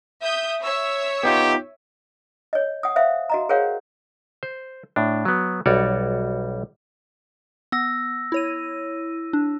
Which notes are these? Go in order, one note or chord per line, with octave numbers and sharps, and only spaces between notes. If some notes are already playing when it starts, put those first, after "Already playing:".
E5 D#6 G6
C#5 E5 E6
B3 D#4 F4 G4
C#5 D#5
F#5 D#6
C5 E5 F5
F#4 D#5 A#5
G#4 A#4 C5 C#5 F5 F#5
C5
A2 D4
F#3 B3
B1 G3 F#4 C#5 D5
B3 E6 A#6
E4 C#5 D#7
D4